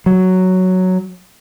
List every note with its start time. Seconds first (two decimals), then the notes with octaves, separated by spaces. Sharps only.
0.06 F#3